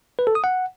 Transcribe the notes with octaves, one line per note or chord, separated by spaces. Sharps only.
B4
A4
D#6
F#5